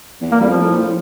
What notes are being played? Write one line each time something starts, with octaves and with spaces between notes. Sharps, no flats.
E2
A#3
F2 G3
F3
A2
A#2
A2